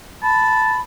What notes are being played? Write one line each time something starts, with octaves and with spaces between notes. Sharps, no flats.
A5 B5